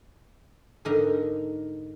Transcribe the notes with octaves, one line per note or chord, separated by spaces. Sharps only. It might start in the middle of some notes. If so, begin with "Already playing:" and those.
G#2 D3 D#4 A#4 A#5